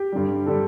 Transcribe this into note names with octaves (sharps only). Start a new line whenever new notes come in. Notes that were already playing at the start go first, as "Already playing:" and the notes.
Already playing: G4
G2 D3 G3
D3 G3 A4